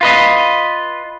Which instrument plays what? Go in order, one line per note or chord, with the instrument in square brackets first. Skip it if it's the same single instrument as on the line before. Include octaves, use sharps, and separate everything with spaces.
[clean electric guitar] F4 B4 D#5